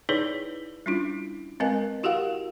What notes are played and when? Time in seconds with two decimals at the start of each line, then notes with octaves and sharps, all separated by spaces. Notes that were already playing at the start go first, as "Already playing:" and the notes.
0.09 D#4 E4 G#4 B4 C#5 D5
0.86 G3 C#4 D4 E4 F4
1.60 G#3 C4 A#4 B4 D#5 G#5
2.03 E4 F#4 G4 A#4 F5 F#5